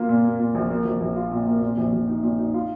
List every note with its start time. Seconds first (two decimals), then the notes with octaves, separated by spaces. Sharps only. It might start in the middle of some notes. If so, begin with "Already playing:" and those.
Already playing: A#3 F4
0.09 A#2
0.24 A#3
0.40 A#2
0.55 A#1
0.70 A#3
0.85 A#1
1.01 A#1
1.16 F4
1.32 A#2
1.47 A#3
1.62 A#2
1.78 A#1
1.93 A#1
2.08 D#4
2.23 A#2
2.39 D#4
2.54 F4